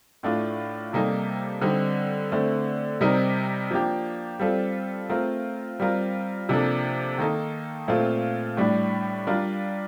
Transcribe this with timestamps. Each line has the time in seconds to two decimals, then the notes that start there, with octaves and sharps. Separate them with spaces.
0.23 A2 A3 D4 F4
0.93 C3 G3 A#3 D#4 A4
1.62 D3 G3 C4 D#4
2.32 D3 A3 C4
3.01 C3 G3 C4 D#4 A#4
3.71 F3 A#3 D4 G4
4.39 G3 C4 F4 A4
5.10 A3 C4 F4 A#4
5.80 G3 C4 F4 A#4
6.49 C3 F3 A#3 D4 A4
7.18 D#3 A#3 D#4 A4
7.88 A#2 A3 C4 F4 A4
8.57 A2 G3 D4
9.27 G3 D4 F4 A#4